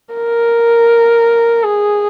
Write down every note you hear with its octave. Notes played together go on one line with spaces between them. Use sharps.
A#4
G#4